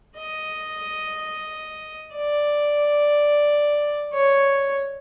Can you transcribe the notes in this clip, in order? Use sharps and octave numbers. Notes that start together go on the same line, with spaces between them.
D#5
D5
C#5